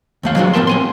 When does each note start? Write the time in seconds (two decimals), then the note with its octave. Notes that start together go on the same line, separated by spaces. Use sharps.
0.23 D#2 A3 F5
0.36 F3 F#3 G#3 C4 D4 F#4
0.53 A2 B3 G4 A#4 A5 C6
0.67 C4 G#5 C6